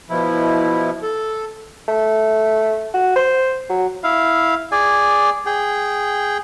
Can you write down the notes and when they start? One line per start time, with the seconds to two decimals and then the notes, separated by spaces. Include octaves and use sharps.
0.10 B2 F3 E4
1.02 A4
1.88 A3
2.94 F#4
3.16 C5
3.69 F#3
4.04 E4 F5
4.72 G#4 D5 G#5
5.46 G#4 G5